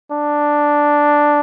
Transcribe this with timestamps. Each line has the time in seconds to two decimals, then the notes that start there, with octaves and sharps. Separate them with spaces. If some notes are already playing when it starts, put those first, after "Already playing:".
0.12 D4